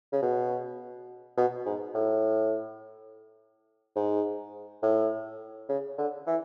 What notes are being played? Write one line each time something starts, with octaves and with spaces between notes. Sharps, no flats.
C#3
B2
B2
G#2
A2
G#2
A2
C#3
D3
E3